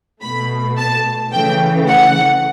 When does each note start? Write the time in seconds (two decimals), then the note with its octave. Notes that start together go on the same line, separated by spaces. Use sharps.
0.21 B2 A3 B5
0.77 A5
1.32 C#3 E3 A3 G5
1.88 F#5